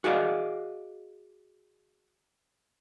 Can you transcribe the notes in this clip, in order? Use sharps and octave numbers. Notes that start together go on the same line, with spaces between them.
F#4 G#4 D5 D#5 F5